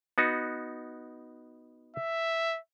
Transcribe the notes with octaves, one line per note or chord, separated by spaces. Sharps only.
B3 D#4 F#4
E5